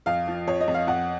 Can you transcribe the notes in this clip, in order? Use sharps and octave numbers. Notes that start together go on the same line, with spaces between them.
F2 F5
F3
F2 C#5
D#5
F2
F5
F2 F#5